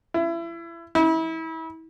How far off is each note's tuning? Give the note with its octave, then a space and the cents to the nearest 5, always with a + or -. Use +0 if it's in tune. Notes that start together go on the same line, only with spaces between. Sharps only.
E4 +30
E4 -30